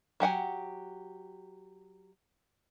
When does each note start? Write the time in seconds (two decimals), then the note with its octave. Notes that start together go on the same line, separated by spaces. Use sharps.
0.20 F#3 G4 F#5 G#5